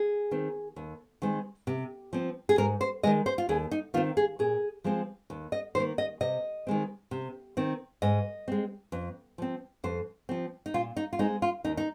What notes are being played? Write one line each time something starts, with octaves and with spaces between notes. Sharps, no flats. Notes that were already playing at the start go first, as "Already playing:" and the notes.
Already playing: G#4
D#3 C4
D#2
D#3 G#3 C4
C3
F3 C4
G#4
G#2 A#4
C5
D#3 G#3 D#5
C5
F4
D#2 G#4
D#4
D#3 C4 F4
G#4
A#2 G#4
F3 G#3 C4
D#2
D#5
D#3 A#3 C5
D#5
C3 D#5
D#3 G#3 C4
C3
D#3 C4
G#2 D#5
G#3 C4
F2
F3 C4
F2 C5
F3 C4
D#4
A#2 F4
D#4
F4
G#3 C4 D#4
F4
D#2 D#4
D#4